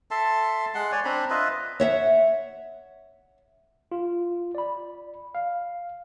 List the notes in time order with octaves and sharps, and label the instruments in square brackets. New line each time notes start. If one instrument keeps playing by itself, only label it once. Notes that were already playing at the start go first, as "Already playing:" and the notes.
[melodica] A4 E5 A5 C6
G#3 F#5 C6
C#5 D5 G#5
C4 D4 A#5 B5
F4 B4 D#5 E5
[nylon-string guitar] C#5 E5 F#5
[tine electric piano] F4
D5 B5
F5